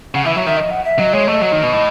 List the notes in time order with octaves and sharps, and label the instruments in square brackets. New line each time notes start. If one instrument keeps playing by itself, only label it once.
[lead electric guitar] C#3 [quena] F#5
[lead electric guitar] E3 [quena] E5
[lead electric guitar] F#3 [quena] E5
[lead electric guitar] D#3 [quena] E5
[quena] D#5
F#5
E5
[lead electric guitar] F#3 [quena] D#5
[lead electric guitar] G#3 [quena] C#5
[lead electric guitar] A3 [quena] D#5
[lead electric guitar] F#3
D#3
B2
A2